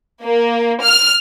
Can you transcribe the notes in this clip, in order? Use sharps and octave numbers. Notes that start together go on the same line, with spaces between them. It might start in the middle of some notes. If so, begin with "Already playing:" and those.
A#3
F6